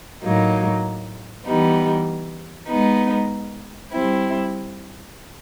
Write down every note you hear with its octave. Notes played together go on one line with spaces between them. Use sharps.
A2 F#3 A#3 D#4
E3 G3 B3 D#4
G#3 B3 D#4
G3 C4 E4